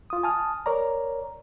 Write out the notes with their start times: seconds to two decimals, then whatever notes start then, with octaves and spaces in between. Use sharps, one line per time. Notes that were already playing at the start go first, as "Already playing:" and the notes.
0.10 F4 D#6
0.23 G#5 A5 D#6 F6
0.66 A#4 C#5 D5 A#5